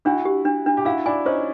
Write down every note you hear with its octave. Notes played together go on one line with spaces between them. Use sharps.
D4 E4 F#4
G4
D4
D4
G4
E4 F#4 F5
D4 E4 G#5
C#4 D#4 C5